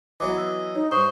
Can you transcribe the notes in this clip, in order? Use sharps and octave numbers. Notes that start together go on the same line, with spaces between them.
E3 F#3 B3 D#5 D6
E6
D#4 C#5
G2 C5 C#6 D#6